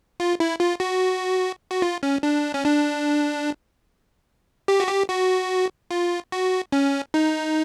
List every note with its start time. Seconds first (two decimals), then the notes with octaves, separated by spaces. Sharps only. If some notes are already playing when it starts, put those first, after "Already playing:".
0.20 F4
0.40 E4
0.60 F4
0.80 F#4
1.71 F#4
1.82 F4
2.03 C#4
2.23 D4
2.54 C#4
2.65 D4
4.68 G4
4.80 F#4
4.89 G4
5.09 F#4
5.91 F4
6.32 F#4
6.72 C#4
7.14 D#4